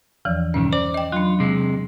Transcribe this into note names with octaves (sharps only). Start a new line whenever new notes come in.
E2 E3 F3
B1 G2 D#3 C#4
C5 D5
D#5 G5
F#3 D4 F4
C3 G#3